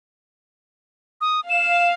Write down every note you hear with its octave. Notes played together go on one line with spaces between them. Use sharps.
D#6
F5 E7